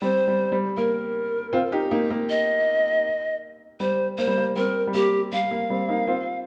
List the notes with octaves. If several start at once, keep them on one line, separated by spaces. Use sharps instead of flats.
G3 C4 C5
G3
G3
A#3 A#4
C4 F4
D#4 G4
A#3 D#4
A#3
D#5
G3 C5
A#3 C5
G3
A#3
G3 C4 A#4
G3
A#3 G4
G3 F5
A#3
G3 C4
A#3 D#4
C4 F4